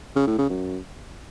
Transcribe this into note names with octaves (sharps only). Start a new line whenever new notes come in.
C#3
A2
C#3
F#2